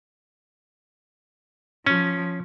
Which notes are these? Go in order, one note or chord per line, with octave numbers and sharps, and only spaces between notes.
F3 C#4